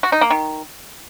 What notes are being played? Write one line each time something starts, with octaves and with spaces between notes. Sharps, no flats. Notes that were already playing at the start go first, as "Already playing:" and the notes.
F#4
D#4
A#3
D#3